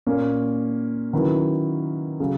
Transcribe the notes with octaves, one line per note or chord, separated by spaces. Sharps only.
A#2 A#3 C#4
D#3 F#3 C#4 E4 B4
C#3 F#3